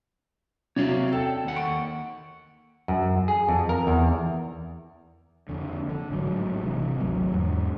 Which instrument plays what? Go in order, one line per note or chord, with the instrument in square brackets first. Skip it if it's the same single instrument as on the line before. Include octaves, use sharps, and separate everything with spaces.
[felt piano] C3 F#3 [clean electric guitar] C#5 D5 F5
[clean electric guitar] A4 [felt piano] G5
[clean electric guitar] D#2 F#5
[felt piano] C#6 D7
[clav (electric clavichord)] F#2
G#4
F2
A#4
E2
[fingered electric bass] F2 D3
D3
A1 G#2 B2 F#3
C3 E3
G#1 D2 D3 F#3
E2 G#2